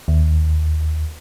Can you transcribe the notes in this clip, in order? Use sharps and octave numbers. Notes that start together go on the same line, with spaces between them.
D#2